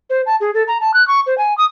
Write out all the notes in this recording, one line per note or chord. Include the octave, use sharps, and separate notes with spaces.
C5
A5
G#4
A4
A#5
A5
F#6
C#6
C5
G#5
D#6